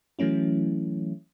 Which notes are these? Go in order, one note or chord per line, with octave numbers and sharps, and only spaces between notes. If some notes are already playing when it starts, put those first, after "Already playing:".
E3 F#3 A3 C#4 E4